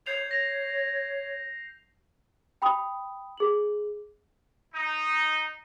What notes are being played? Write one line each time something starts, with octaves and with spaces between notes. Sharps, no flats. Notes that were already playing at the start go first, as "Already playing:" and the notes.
C#5 G6 C7 F7
A#6 F7
G5 B5 D#6
G#4 F#7
D#4